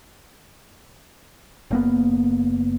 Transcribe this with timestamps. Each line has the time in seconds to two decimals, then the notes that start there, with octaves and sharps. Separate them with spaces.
1.71 F#1 A#3 B3